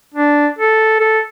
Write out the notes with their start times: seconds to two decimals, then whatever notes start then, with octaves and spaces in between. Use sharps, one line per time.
0.14 D4
0.59 A4
0.99 A4